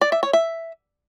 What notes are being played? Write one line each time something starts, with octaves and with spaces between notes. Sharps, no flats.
D5
E5
C#5
E5